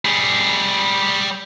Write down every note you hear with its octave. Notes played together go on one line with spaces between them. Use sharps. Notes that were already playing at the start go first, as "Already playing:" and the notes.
G3 G#4